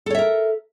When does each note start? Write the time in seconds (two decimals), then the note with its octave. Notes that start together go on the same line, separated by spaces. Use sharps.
0.06 A4
0.10 C#5
0.15 E5
0.19 A#4